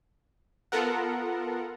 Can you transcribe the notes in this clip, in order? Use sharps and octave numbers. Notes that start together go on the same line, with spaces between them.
B3 F4 A4 A#4 F#5